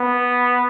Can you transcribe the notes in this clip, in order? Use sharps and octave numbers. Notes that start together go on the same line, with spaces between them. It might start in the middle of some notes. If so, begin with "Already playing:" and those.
Already playing: B3